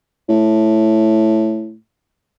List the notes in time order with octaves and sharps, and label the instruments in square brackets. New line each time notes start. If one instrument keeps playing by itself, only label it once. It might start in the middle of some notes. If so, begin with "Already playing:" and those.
[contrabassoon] A2